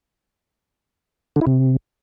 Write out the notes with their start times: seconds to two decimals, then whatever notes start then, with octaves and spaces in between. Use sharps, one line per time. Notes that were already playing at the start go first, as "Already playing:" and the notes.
1.36 D3
1.41 E4
1.47 C3